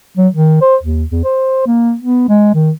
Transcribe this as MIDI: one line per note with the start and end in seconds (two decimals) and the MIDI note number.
0.18 0.28 54
0.34 0.57 51
0.61 0.76 72
0.83 1.04 39
1.11 1.23 40
1.24 1.62 72
1.66 1.94 58
2.01 2.29 59
2.29 2.53 56
2.54 2.71 51